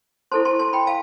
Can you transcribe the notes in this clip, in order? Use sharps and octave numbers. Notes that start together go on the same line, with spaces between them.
E4 A4 C5 A5 C6
A5 C6
A5 C6
G5 B5
F5 A5